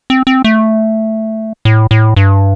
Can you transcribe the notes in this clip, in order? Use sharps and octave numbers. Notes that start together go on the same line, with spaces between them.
C4
C4
A3
A2
A2
G2